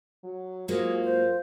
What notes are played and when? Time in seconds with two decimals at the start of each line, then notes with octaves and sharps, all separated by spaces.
0.24 F#3
0.68 G#2 F#3 A#3 F4 G#4
1.04 C5